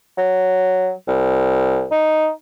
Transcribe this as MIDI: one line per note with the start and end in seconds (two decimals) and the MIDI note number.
0.17 0.91 54
1.08 1.86 36
1.92 2.29 63